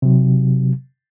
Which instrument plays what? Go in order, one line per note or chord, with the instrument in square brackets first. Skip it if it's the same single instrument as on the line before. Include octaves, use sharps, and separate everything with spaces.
[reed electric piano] C3 F#3